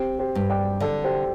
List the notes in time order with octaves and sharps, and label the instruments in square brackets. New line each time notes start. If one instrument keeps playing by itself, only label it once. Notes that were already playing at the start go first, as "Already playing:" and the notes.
Already playing: [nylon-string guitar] C4 [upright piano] G4 C5
[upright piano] G4 C5
[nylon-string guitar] G2
[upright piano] D5 G5
[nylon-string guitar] D3 [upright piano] A4 D5
[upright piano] G4 C5